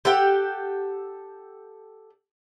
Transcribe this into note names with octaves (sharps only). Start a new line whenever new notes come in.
G4 A4 F#5 G5